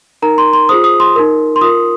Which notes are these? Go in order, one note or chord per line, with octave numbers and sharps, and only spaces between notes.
D#4 A#4 A#5
C6
C6
F4 G#4 C5 D#6
D#6
C6
D#4 A#4
C6
F4 A#4 D#6